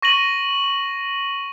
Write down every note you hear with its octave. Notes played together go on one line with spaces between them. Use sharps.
C#6 A#6 D#7 F#7